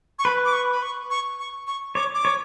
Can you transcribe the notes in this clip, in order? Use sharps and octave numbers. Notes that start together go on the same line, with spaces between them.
C#6
B4 B5
D6
C#6
B5
C#6
C#6
C#6
C#6
C#5 D6
D6
C#5